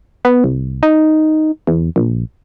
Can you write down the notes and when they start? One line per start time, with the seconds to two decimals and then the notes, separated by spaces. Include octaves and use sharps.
0.25 B3
0.44 C2
0.83 D#4
1.67 E2
1.96 A#1